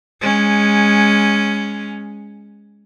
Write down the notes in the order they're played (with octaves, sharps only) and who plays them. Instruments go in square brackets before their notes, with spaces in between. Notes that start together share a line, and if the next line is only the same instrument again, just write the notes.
[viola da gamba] G#3 C#4